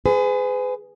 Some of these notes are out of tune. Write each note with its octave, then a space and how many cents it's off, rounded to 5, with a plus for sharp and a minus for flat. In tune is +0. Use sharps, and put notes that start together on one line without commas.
G#4 +0 B4 +40